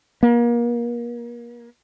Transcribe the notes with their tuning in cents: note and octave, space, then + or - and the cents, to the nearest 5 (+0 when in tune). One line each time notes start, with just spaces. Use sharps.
A#3 +35